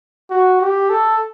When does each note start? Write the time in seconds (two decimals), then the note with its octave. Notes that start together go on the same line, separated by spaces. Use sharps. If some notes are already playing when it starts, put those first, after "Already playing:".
0.30 F#4
0.61 G4
0.90 A4